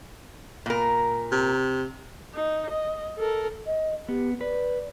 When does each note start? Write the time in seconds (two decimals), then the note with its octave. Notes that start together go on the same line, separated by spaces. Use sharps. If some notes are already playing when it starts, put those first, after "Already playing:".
0.66 A#2 A#4
1.32 C3
2.34 D#4
2.70 D#5
3.18 A4 A#4
3.66 D#5
4.09 B3 G4
4.41 B4 D5